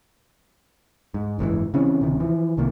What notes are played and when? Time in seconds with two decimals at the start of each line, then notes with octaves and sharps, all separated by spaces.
1.14 G#2
1.39 F#1 G#2 D3 E3
1.74 C#3 E3 C4 C#4
2.01 D1 C3 D#3
2.20 E3 F3
2.57 C2 C3 D#3 A#3